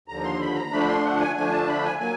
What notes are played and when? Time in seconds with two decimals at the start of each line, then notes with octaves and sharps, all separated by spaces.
0.08 D#2 D3 F3 A#5
0.24 C6
0.40 B5
0.55 A#5
0.72 D3 F3 A3 D4 B5
0.88 C6
1.04 F#5
1.20 G#5
1.36 D3 F3 A3 D4 G#5
1.51 A5
1.68 B5
1.84 G#5
2.00 F#3 A#3 G#5